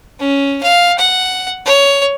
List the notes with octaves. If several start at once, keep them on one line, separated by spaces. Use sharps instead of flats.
C#4
F5
F#5
C#5